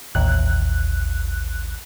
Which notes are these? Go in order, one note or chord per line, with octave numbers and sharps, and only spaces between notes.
A1 D#2 F#6